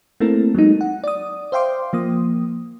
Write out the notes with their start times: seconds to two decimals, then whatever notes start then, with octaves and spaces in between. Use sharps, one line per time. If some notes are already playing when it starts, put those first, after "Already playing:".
0.20 A3 A#3 C4 E4 A4 A#4
0.55 F#3 G#3 A3 D#4
0.81 F#5
1.04 D5 D#6
1.52 C5 E5 F5 G5 C6 D6
1.93 F3 A#3 D#6